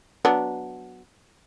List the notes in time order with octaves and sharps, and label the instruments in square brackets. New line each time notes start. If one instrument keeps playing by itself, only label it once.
[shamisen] F#3 B3 D4